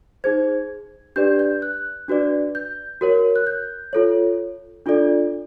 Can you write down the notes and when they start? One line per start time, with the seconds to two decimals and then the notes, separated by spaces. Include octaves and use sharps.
0.24 D#4 G#4 C5 G#6
1.16 D4 G4 B4 D5 G6
1.39 G6
1.62 F#6
2.08 D4 F#4 B4 D5
2.55 G6
3.01 F#4 A#4 C#5
3.36 F#6
3.47 G6
3.93 F4 A4 C#5
4.86 D4 F4 A4 D5